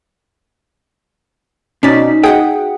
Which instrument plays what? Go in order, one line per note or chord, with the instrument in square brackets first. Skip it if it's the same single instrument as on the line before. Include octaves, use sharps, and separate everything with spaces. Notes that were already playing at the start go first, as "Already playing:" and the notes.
[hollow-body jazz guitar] B2 D5 [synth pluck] C#4 B6 [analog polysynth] D#4
[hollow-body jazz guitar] F#4 F#5 G5 [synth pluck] G#4